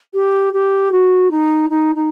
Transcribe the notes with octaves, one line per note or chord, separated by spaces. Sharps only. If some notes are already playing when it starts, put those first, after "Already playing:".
G4
G4
F#4
D#4
D#4
D#4